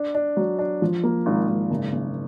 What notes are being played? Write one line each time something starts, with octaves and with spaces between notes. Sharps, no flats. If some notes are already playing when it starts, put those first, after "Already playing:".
Already playing: D4
D4
F#3
D4
F3
A#3
G#1
G#1
F#1
F#1